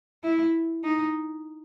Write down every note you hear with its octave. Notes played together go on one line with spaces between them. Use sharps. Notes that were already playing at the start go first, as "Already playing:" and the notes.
E4
D#4